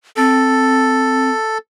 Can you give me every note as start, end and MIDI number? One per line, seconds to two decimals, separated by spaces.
0.17 1.30 60
0.17 1.58 69